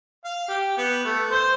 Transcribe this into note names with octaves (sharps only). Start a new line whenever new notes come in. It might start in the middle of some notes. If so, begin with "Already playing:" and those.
F5
G4
B3
A3
C5